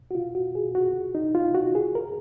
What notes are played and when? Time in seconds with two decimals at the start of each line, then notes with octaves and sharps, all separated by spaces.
0.11 F#4
0.15 F4
0.35 F#4
0.55 G#4
0.75 F#4
1.15 D#4
1.35 F4
1.55 F#4
1.75 G#4
1.95 A#4